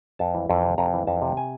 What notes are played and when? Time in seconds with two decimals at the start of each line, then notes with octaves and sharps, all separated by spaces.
0.19 F2 A5
0.34 E3
0.50 F2
0.63 C3
0.78 F2 A#5
0.93 E3
1.07 F2 A5
1.22 C3
1.37 G#5